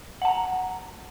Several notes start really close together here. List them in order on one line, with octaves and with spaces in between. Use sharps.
F#5 A5 A#5